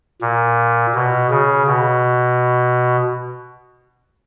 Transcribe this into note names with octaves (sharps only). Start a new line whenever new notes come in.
A#2
B2
C#3
B2